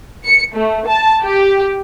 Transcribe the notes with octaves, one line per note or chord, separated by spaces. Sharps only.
C#7
A3
A5
G4